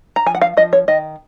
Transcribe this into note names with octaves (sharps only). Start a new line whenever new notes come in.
A#5
F3 G#5
F#5
F5
F3 D#5
C#5
D#3 D#5